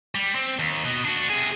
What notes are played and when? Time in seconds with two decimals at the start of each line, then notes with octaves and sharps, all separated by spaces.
0.15 G3
0.35 C4
0.59 D#2
0.84 B2
1.05 D4 F#4
1.30 C3 G#4